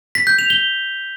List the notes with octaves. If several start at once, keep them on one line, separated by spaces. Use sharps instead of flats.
B6
G6
F7
G7